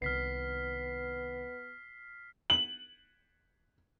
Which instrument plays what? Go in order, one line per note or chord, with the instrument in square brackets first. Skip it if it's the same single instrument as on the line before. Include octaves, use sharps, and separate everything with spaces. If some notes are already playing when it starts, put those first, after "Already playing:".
[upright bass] C2 D#3 [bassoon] B3 [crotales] F6 B6 C7
[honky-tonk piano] F#7